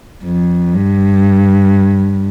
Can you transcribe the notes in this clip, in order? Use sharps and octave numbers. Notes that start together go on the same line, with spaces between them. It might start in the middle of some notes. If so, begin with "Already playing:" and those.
F2
G2